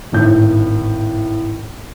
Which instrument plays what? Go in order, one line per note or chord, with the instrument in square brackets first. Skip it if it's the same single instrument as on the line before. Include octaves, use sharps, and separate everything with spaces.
[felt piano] G#1 A2 G6